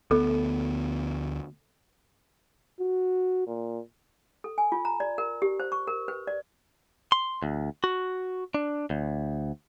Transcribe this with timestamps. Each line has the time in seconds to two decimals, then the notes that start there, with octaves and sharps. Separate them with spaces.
0.11 D2 B3 A4
2.80 F#4
3.47 A#2
4.44 A4
4.58 G#5
4.72 F4
4.85 A#5
5.00 D5
5.18 A#4
5.42 G4
5.60 C5
5.72 C#6
5.87 A#4
6.08 B4
6.27 D5
7.12 C6
7.43 D2
7.84 F#4
8.54 D4
8.90 D2